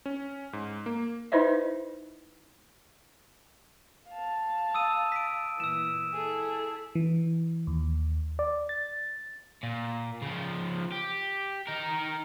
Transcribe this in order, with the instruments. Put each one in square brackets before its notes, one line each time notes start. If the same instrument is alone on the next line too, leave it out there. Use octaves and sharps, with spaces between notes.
[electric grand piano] C#4
G#2
A#3
[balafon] D#4 E4 B4 C5 D#5 E5
[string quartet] F5 A5
[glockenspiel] D#6 E6 D#7
B6 D7
[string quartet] A#2 E3 [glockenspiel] E6 E7
[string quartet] E4 G#4 A4
[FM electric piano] E3
D#2
D5
A6
[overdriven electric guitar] A#2
C#3 F3
G4
D#4 A#4